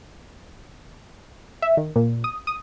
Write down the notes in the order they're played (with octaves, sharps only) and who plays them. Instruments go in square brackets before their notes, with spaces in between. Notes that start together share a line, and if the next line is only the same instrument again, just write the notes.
[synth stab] E5
D#3
A#2
D#6
D#6